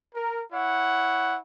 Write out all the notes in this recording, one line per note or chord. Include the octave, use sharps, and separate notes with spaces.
A#4
E4 C#5 F#5